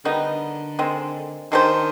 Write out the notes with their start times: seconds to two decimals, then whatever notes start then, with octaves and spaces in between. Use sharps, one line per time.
0.05 D3 D#3 G3 B3 D#4
0.79 D#3 G#3 C4
1.52 D#3 G#3 D4 G4 C5